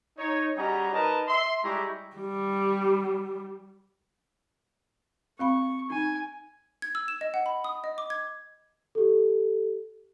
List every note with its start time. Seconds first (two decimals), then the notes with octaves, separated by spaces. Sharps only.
0.18 D#4 C#5
0.57 G3 C#4 F#4 G#4 D#5 A#5
0.93 D#4 A#4 B4 D#5 A5 A#5
1.27 E5 C6
1.63 G3 G#3 E4 G4 A#5 C#6
2.16 G3
5.39 C4 F5 B5 C#6
5.90 D#4 G#5
6.82 G#6
6.95 E6
7.08 E7
7.21 D#5
7.34 F#5
7.46 B5
7.64 D#6
7.84 D#5
7.98 D6
8.10 G#6
8.95 G4 A4